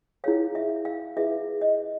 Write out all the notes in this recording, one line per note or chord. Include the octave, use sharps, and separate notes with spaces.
E4 G#4 C#5 F5
E5
F5
E4 G#4 B4 E5
D#5